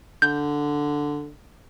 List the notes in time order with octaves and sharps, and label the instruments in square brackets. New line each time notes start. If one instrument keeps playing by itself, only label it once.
[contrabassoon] D3 [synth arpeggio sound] G6